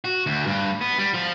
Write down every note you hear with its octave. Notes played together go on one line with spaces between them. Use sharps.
F#4
D2
G2
B3
G3
F3